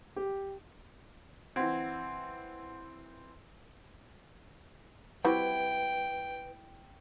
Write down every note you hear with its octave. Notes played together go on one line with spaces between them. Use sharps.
G4
E3 C4 F#5 G#6
G3 C4 E4 F#4 B4 G5